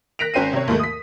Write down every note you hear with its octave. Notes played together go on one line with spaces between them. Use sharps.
F#6 A#6 B6 D7 F7
G#1 C#4 C5 G5 C7 D#7
C3 C#5
D#2 G#2 D#3 A3
D#6 B6